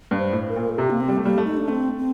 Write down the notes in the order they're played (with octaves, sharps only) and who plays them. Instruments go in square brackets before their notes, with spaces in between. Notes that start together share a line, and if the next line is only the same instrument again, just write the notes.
[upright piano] G2
[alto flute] C5
[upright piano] A2
[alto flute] A#4
[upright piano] A#2
[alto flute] A4
[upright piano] C3 [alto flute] G4
[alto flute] A#3
C4
[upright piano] G3
A3
[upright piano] G3 [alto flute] A#3
[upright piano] A3
[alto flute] D#4
D4
[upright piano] A3 [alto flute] C4
[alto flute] C4